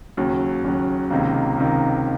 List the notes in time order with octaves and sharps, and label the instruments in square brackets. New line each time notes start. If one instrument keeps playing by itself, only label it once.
[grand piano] D#2 C#3 F#3
D#2 C#3 F#3
C#2 C3 D#3 A#3
C#2 C3 D#3 A#3